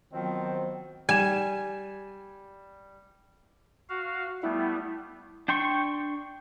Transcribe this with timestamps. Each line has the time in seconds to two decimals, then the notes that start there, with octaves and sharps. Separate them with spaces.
0.13 D#3 F3 F#3 B3 C4 C5 D#5
1.09 G3 G#5 E7
3.89 F#4 F5
4.43 G3 A3 B3 E4
5.48 D4 G5 C6 C#6